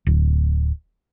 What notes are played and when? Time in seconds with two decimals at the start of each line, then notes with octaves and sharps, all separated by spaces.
0.07 D1